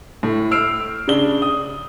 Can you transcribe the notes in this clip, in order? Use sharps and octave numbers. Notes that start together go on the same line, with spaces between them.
A2
E6 F6 C7 D7
C#3 D4 G7
D#6